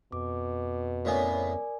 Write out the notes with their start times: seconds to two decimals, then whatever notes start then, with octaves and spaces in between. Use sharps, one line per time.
0.12 F2 B2 D6
1.05 A2 C#3 B3 A#4 D5 G#5